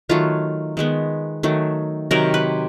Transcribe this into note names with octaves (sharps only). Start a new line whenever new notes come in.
D#3 F#3 A3 F4
D#3 G#3 B3
D#3 F#3 A3
C3 D#3 F#3 A#4
B4